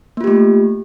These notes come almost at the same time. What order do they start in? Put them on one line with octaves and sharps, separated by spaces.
A#3 F4 G4 A3